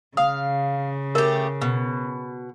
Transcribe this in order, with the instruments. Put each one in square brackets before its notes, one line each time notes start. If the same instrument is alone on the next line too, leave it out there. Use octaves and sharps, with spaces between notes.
[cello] C#3 [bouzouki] F5 [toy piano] D#6
[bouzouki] A3 G4 [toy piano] A#4
[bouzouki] B2